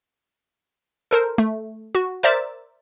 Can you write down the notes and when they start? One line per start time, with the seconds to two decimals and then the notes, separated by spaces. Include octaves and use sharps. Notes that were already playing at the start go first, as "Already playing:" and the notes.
1.11 A4 A#4 C5
1.38 A3
1.95 F#4
2.23 A#4 C5 D5 E5 A6 E7